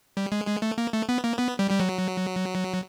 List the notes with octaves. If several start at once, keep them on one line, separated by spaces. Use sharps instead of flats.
G3
G#3
G#3
A3
A#3
A3
B3
A#3
B3
G3
G3
F#3